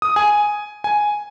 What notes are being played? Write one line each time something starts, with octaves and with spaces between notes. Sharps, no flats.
D#6
G#5
G#5